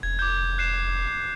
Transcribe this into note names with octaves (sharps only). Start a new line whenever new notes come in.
F1 G#6
D6 G6
F#6 C7 E7